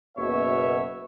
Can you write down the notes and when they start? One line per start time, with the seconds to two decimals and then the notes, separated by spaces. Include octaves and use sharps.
0.18 F#1 B2 C#5 E5